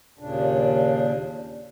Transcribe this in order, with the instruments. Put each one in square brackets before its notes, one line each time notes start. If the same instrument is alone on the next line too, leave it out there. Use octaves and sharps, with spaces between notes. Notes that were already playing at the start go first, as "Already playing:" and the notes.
[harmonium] D#2 A#2 C#3 D4